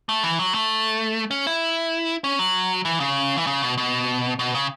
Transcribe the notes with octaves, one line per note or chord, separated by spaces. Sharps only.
A3
E3
F#3
A3
C#4
E4
C#4
F#3
E3
C#3
E3
C#3
B2
B2
B2
C#3